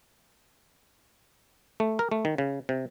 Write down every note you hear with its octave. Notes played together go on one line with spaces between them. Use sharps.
A3
A#4
A3
D#3
C#3
C3